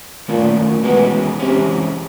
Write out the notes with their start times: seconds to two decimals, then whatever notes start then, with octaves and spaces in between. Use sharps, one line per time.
0.28 A#2 D#3 F#3 A3 C#4
0.83 B2 E3 G#3 C#4
1.39 C3 E3 G#3 C#4